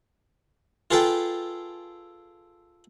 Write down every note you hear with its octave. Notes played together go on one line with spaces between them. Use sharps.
F4 G#4 A4 B4 G5